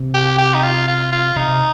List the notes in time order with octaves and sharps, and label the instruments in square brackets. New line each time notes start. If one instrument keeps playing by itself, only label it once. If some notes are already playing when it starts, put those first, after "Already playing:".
Already playing: [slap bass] C3
[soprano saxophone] G4
G4
D#4
F4
F4
F4
[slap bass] C3 [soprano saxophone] D#4